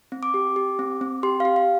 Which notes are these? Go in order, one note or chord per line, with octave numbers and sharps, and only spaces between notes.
C4
D6
G4
G4
C4
C4
G4 C6
G4 F5
F5